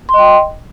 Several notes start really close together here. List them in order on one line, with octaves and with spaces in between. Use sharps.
C6 D#5 G5